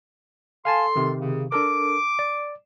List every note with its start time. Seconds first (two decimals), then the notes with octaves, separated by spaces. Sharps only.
0.65 A4 F5 G#5 A5 C6
0.96 C3 D#3
1.19 C#3
1.52 D4 A4 A#4 D6
2.19 D5